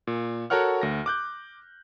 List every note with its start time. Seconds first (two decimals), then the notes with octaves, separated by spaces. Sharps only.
0.07 A#2
0.50 F#4 A4 A#4 C#5 F#5 F6
0.81 D2 A#6
1.06 D6 F#6 G6